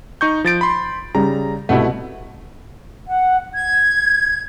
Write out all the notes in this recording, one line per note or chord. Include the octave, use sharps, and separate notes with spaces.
D#4 C#6 G6
F3 A6 D7
B5 C6
C#3 G3 A#5
C2 B2 A3 E4 F#5
F#5
G#6